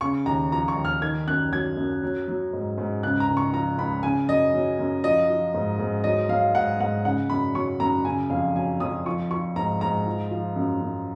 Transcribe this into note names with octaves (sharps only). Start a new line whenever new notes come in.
C#3 C#6
D#2 A#5
F3 A#5
C#6
D#2
F6
D#3 G#6
F#2 F#6
F#3 G#6
F#2
F#3
F#3
G#2
G#2
C#3 F#6
A#5
C#2
C#6
F3 A#5
C#2 B5
C#3 G#5
F#2 D#5
F#3
F#2
F3 D#5
F3
G#2
G#2
F#3 D#5
F#3 F5
G#2 F#5
G#2 F#5
C#3 F#5
F#2 B5
F#3 C#6
F#2 A#5
C#3 G#5
F2 F5
F#3 G#5
F2 D#6
F3 C#6
F3 C#6
G#2 A#5
G#2 A#5
F3
F3
F#2
F#2